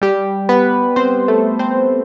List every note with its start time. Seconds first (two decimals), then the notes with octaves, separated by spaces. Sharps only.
0.02 G3 G4
0.49 B3 B4
0.96 C4 C5
1.28 A3 A4
1.59 C4 C5